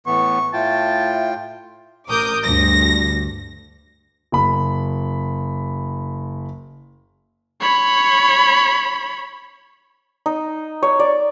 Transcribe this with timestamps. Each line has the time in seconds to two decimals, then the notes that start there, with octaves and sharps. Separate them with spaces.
0.07 A2 E3 B3 C#6
0.53 A2 F4 E5 G5 A5
2.08 A1 A#4 D6 D#6 G6
2.44 D2 G2 A#6
4.32 F#1 B5
7.61 C#5 B5
10.26 D#4
10.83 C#5
10.99 D5